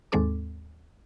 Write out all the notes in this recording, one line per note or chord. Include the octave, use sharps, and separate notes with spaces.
D#2 G#2 G#3 C4 A4 D6